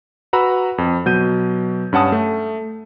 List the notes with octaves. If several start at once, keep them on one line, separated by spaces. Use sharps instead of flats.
F#4 B4 A#5 B5 E6
F2
B2 F#3 G6 D#7
G2 C#4 F#5 A5 D#6
A3